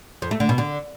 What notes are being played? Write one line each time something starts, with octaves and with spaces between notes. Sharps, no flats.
F2
A3
D3
B2
D3